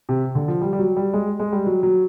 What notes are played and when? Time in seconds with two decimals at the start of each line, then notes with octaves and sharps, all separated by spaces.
0.09 C3
0.35 D3
0.48 F3
0.61 G3
0.73 G3
0.79 F#3
0.97 G3
1.14 G#3
1.40 G#3
1.52 G3
1.66 F#3
1.83 F#3